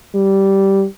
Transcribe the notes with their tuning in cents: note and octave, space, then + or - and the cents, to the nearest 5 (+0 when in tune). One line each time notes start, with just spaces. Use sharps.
G3 -10